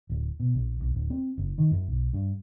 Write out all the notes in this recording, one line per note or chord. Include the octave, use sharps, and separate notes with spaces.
D1
B2
A#1
B1
D1
C4
F#1
D#3
F#2
B1
G2